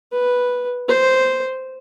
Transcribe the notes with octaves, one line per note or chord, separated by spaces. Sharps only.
B4
C5